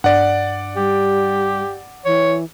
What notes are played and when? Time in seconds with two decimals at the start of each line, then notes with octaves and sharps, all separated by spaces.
0.04 G2 D5 F#5
0.76 G3 G4
2.05 E3 C#5